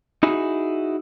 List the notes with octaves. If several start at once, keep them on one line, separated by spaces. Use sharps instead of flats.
D#4 E4 F#4 G#4